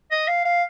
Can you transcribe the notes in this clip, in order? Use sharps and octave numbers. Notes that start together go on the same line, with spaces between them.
D#5
F5
F5